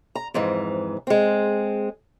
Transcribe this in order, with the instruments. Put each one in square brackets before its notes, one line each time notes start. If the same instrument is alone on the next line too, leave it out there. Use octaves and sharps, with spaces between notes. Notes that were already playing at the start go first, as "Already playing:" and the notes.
[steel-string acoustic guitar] A#5
F2 G#2 E3
G#3 C4